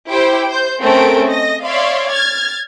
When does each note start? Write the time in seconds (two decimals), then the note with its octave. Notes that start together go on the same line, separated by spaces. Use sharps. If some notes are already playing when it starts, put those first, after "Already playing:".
0.10 E4 G4 C5 G5
0.48 C5 G6
0.81 A3 C4 C#4 G#4 A#4 D7
1.30 D#5 A#6
1.65 C#5 D5 E5 F5 C6
2.10 F6 G#6 A6